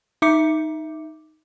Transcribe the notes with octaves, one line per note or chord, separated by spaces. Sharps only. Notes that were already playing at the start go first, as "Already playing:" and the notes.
D#4 E5 D6 C#7